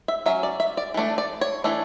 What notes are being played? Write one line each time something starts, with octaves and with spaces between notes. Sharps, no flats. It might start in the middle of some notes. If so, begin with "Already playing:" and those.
E5
F#3 C#4 E5
D5
E5
D5
E3 A3 D4
D5
C#5
E3 A3 D4